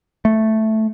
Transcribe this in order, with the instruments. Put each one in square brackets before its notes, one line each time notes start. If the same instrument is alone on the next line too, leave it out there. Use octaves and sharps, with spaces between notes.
[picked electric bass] A3